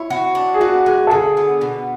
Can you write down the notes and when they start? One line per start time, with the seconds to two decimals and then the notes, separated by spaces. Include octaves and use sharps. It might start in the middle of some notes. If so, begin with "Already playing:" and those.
Already playing: E4 C#5
0.10 F#4
0.35 D4
0.54 G#4
0.60 B3 F#4
0.86 G#3
1.07 A4
1.11 D3 G#4
1.37 B3
1.61 B2